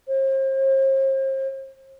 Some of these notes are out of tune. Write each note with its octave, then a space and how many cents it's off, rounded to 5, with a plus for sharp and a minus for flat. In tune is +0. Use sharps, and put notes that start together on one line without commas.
C5 +40